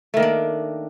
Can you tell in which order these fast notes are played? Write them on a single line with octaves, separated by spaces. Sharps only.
A3 D#3 A#3 D4